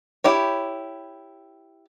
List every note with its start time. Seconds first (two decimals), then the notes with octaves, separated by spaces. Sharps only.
0.24 E4 G4 C#5